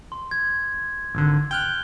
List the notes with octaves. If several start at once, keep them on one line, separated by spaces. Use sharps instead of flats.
C6
G#6
G#1 D3
G5 F6 F#6 G7